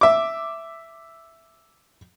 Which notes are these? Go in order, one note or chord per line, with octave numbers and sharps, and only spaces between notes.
E5 D6